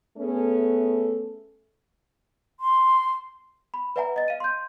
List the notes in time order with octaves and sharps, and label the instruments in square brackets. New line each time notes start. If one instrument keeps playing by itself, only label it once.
[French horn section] A3 B3 C#4 G#4 A4
[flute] C6
[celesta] B5
B4 D5 E5 F#5 G#5 A#5
D#5 A6
F5 D#7
C6 G6